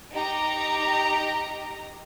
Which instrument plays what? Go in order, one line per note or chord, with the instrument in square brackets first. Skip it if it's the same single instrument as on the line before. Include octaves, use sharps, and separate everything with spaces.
[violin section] D#4 G4 A#5